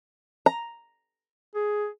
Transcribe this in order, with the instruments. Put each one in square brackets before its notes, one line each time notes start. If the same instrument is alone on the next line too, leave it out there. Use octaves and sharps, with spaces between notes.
[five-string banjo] A#5
[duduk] G#4